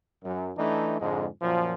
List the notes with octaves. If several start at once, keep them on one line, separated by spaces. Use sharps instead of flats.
F#2
E3 A3 D4 D#4
F2 G#2 D3 G#3
F#2 A#2 F3